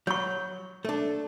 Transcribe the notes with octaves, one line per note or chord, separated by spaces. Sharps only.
F#3 C#5 C#6
A3 D4